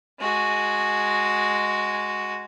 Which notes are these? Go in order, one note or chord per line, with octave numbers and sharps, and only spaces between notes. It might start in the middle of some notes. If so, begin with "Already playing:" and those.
G#3 F#4